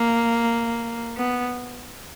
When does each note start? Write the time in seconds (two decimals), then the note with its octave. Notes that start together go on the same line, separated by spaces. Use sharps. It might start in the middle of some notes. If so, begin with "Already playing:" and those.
Already playing: A#3
1.18 B3